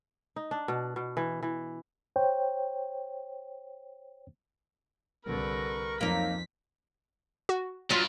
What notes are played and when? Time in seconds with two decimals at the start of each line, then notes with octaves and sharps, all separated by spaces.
0.36 D#4
0.51 D4
0.68 B2
0.96 B2
1.17 E3
1.43 E3
2.16 C5 C#5 G5
5.26 C2 D3 A#4 B4 C#6
6.01 F2 F3 F#3 A#3 D#4 A#4 B6
7.49 F#4
7.90 G2 F#3 F4